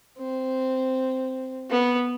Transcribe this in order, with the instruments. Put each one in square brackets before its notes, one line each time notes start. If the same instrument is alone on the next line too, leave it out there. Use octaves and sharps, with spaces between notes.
[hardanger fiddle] C4
B3